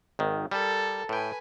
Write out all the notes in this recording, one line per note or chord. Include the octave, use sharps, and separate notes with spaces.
G#1 D#3
G3 A4 A#4
A2 B4 G5 G#5